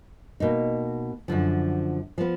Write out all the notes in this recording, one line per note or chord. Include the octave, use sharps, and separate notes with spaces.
B2 A#3 D#4
F#2 D3 F3
F3 B3